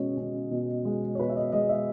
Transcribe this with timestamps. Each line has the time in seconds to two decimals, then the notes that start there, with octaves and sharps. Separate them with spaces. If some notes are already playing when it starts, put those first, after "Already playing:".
Already playing: B2 G#3 C#4 C#5
0.17 C#4
0.51 B2
0.85 G#3
1.15 C#5
1.19 B2 B4
1.29 E5
1.36 D#5
1.52 G#3 D#5
1.69 E5